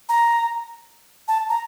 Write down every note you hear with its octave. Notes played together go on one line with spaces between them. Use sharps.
A#5
A5
A#5